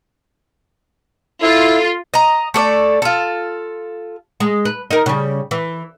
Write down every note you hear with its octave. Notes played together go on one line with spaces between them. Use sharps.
E4 F4 A4
D#5 A#5
A3 A4 D5
F4 A4
G#3
B4
D#4 A#4
C#3 G3
E3